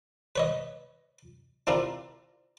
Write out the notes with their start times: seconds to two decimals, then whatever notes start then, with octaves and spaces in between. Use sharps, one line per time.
0.36 B4 C#5 D#5
1.67 C4 D4 E4 F4 A#4